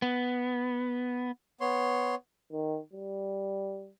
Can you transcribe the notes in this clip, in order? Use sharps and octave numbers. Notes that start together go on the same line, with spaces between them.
B3
B3 C#5 C6
D#3
G3